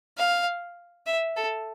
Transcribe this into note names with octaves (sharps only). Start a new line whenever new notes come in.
F5
E5
A4